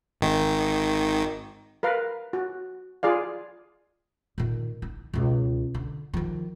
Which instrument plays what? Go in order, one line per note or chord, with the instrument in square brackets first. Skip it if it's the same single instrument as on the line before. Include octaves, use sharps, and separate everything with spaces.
[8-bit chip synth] G#1 D#3
[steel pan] A#4 B4 F5
F#4
F4 G#4 D5 F5
[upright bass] A#2 D#3
D#4
C#2 B2
D3
D#3 F3